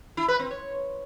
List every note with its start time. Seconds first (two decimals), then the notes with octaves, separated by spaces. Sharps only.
0.17 E4
0.28 B4
0.39 C4
0.51 C#5